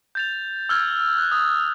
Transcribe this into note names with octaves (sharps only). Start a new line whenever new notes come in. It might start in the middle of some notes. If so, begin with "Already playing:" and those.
G6 A6 F7
E6 F6 G#6
F#6
D#6